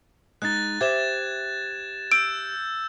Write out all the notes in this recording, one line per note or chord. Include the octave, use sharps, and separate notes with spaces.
G#3 D#4 F#6 A6
G4 C5 E5 G#6 E7
E6 G6 D7